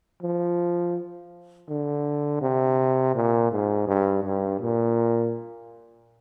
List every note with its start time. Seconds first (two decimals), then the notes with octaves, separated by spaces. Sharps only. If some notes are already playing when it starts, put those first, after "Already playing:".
0.22 F3
1.69 D3
2.41 C3
3.15 A#2
3.51 G#2
3.87 G2
4.24 G2
4.61 A#2